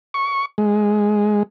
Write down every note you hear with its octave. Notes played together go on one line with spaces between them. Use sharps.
C#6
G#3